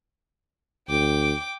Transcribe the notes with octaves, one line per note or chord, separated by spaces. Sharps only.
D2 G5 D6